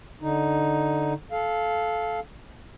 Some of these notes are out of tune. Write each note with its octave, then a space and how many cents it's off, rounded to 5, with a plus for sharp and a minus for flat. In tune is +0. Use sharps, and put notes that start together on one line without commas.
D3 +0 D#4 +0
A4 -20 F5 +0